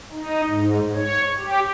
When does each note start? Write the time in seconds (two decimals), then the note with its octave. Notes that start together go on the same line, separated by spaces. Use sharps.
0.12 D#4
0.47 G#2
0.95 C#5
1.38 G4